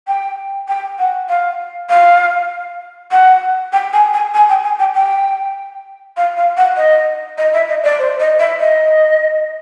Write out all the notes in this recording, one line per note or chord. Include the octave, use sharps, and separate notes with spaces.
G5
G5
F#5
F5
F5
F#5
G5
G#5
G#5
G#5
G5
G#5
G5
G5
F5
F5
F#5
D#5
D#5
E5
D#5
D5
C5
D#5
E5
D#5